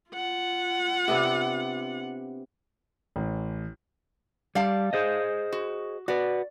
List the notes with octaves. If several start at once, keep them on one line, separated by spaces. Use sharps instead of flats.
F4 F#5
C3 B3 D4
A1
G3 D5 F5 A5
G#4 C5 D#5
F#4
F#4 B4 D5